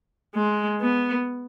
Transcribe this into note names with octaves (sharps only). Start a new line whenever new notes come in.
G#3
B3